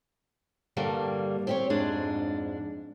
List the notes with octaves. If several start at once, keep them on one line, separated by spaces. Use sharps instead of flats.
G2 D3 G3 A#3
C4 G4 C#5
F2 G#2 G#3 D4